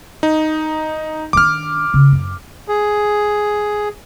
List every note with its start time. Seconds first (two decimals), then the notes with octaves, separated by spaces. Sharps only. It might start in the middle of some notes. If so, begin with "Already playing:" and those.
0.23 D#4
1.33 D#3 D4 D6 F6
1.94 C#3
2.12 F#2
2.68 G#4